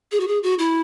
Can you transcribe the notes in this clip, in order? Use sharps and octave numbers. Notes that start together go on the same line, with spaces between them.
G#4
F#4
G#4
F#4
E4